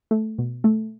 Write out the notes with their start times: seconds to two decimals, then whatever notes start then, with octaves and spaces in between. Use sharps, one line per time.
0.11 A3
0.39 B2
0.64 A3